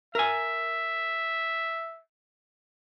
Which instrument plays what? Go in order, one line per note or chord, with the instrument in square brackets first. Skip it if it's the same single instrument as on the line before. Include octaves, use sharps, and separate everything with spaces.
[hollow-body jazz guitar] A#4 G#5 [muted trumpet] E5